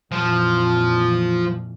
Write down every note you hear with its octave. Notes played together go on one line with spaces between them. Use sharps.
F2 A#2 E3 F3